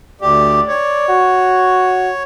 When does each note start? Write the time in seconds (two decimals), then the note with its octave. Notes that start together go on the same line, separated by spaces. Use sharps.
0.22 D2 G4 D5
0.68 C#5
1.09 F#4